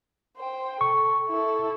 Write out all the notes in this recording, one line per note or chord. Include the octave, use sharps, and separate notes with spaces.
C5 G5
A4 C#6
E4 A4